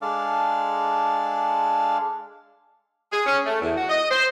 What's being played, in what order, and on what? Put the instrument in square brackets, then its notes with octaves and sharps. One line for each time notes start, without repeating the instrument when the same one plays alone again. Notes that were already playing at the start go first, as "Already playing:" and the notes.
[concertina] G#3 D4 A4 D5 F5
[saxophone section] G#4
C#4
A3
E2
F#4
D#5
C5